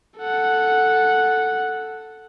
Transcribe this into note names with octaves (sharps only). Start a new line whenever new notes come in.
A4 F#5